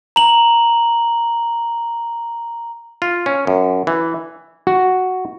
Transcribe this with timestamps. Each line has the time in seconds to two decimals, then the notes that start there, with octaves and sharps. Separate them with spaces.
0.16 A#5 F#7
3.02 F4
3.26 C#4
3.47 F#2
3.87 E3
4.67 F#4